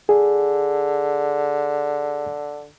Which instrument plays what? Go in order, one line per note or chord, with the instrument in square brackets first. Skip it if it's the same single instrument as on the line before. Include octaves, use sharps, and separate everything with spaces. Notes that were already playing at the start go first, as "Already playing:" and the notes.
[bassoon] D3 [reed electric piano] G#4